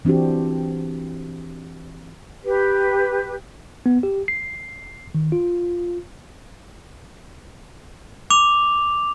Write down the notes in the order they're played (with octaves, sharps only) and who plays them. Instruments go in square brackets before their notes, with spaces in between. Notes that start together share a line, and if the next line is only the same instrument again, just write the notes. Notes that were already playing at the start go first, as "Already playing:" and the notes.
[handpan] E3 C4 D4 F#4 G4
[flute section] G4 B4
[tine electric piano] B3
G4
C7
D#3
F4
[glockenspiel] D6 F7